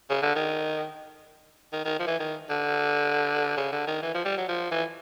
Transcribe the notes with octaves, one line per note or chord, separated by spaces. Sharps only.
C#3
D3
D#3
D#3
D#3
F3
E3
D#3
D3
C#3
D3
D#3
E3
F3
G3
F#3
F3
E3